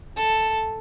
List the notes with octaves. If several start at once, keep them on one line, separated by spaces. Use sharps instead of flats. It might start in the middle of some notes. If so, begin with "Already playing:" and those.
A4